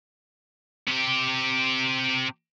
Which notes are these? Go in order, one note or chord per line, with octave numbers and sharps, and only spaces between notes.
C3 G4